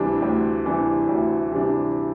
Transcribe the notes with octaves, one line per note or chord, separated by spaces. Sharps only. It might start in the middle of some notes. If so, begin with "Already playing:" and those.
Already playing: D2 C3 E3 G3 D4
D2
C3 E3 G3 D4
D2
C3 E3 G3 D4